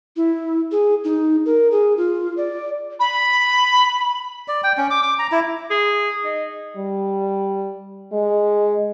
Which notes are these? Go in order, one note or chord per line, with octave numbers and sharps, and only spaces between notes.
E4
G#4
D#4
A#4
G#4
F4
D5
B5
D5
G5
C#4
D6
D6
A#5
E4
G#4
D#4
G3
G#3